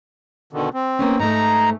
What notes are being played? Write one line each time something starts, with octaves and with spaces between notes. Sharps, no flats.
B2 D3 D#3
C4
A#3 B3 C#4
G#2 A3 D#4 A#5